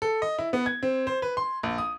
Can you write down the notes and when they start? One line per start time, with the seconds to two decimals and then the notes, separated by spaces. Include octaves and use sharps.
0.02 A4
0.22 D#5
0.39 E4
0.53 B3
0.66 G#6
0.83 C4
1.07 C5
1.22 B4
1.37 C6
1.63 A#1
1.78 D#6